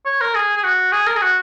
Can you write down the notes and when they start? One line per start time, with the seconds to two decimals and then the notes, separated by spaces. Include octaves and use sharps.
0.05 C#5
0.21 A#4
0.35 G#4
0.56 G#4
0.64 F#4
0.92 G#4
1.07 A#4
1.16 G#4
1.22 F#4